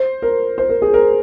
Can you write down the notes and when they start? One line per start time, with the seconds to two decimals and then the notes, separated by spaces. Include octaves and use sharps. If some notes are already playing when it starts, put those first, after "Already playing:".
Already playing: C5
0.22 A#4
0.58 C5
0.69 A#4
0.82 G#4
0.94 A#4